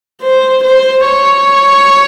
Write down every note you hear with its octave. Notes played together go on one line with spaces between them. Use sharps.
C5
C5
C#5